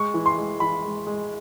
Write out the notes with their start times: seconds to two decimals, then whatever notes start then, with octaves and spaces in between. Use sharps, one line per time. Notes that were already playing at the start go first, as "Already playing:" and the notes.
Already playing: G#3 C#6
0.14 E3
0.26 C6
0.38 G#3
0.60 E3 B5
0.84 G#3
1.07 G#3